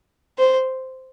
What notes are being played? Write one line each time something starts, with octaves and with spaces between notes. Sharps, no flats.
C5